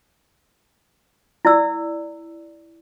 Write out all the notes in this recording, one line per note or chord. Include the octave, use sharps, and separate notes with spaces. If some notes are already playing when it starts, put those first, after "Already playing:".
E4 D5 E6